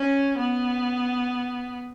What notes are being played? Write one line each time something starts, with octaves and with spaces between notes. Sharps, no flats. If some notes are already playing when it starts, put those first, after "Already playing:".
Already playing: C#4
B3